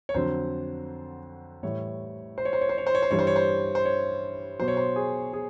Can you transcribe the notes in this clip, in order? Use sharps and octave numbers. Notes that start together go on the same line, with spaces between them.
C#5
F2 D3 F#3 C5
A2 E3 G3 C#5
C5
C#5
C5
C#5
C5
C#5
C5
C#5
C5
G2 E3 G3 C#5
C5
C#5
C5
C5
C#5
B2 F#3 C5
C#5
C5
G#4
G#4